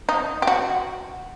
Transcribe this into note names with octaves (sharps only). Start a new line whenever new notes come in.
D#4
G4
F#4